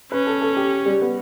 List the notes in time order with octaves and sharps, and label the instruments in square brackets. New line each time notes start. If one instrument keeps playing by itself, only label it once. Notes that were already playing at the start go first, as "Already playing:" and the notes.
[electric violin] C#4 [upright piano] B4
[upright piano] A4
A4
G4
G3
B3